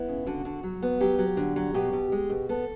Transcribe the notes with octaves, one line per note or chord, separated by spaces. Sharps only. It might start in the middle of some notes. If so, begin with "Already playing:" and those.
Already playing: B3 E4
C#3
D3 F#4
D3
F#3
B3
F#3 G4
F#3
D3
F#3
B2 G4
B2
G#3
B2
B3 A4